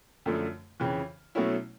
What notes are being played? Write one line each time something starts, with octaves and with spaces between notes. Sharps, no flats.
F#2 D3 F3 A3
F2 C#3 E3
B2 F#3 A3 C#4 E4